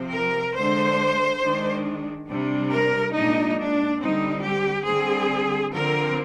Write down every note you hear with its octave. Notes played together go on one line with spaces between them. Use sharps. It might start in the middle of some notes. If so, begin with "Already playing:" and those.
Already playing: C3 F3 C4
A#4
D3 G#3 D4 C5
D#3 G#3 D4
C3 G3 D4
A#4
A#2 G#3 D4 D#4
D4
D3 G3 C4 D#4
G4
D3 G3 C4 G#4
D3 F3 C4 A#4